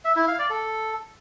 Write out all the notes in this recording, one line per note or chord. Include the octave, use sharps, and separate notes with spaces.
E5
E4
F5
D5
A4